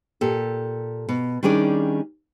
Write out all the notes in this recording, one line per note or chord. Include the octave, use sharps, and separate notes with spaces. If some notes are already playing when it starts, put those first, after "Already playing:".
A#2 G4 A4
B2
D#3 G3 C#4 D4 G#4 D5